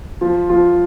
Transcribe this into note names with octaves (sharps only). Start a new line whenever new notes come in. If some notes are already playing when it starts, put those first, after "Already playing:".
F3 F4
F3 F4